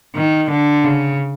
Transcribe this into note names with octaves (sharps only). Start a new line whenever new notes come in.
D#3
D3
C#3